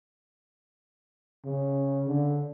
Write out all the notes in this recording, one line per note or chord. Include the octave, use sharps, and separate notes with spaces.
C#3
D3